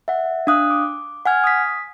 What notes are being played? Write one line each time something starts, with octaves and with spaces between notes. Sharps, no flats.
E5 F#5
D4 F5 D#6 F#6
D6
F#5 G#5 F6 G#6
D#6 B6